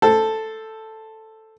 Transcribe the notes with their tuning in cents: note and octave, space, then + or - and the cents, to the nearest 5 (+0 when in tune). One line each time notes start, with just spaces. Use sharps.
A4 +0 C5 +0